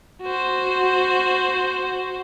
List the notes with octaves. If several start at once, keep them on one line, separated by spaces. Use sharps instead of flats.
F#4 C5